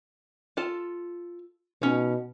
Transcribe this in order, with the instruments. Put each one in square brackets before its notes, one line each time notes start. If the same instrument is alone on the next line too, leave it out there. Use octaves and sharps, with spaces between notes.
[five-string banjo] F4 A4 A5
[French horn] B2 [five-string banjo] C#4 D#4